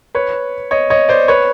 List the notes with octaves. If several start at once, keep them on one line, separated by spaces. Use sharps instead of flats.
B4 C#5
C#5 D#5
C#5 D#5
C5 D5
B4 C#5